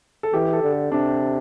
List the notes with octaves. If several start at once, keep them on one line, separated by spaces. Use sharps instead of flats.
A4
E3 G4
A4
D3
A4
C3 D4